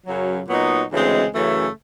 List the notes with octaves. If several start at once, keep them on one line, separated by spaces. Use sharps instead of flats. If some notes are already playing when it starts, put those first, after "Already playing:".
F#2 C#3 F#3
A#2 F#3 B3 D#4
D2 C#3 E3 G#3 C4
F#2 C#3 E3 A3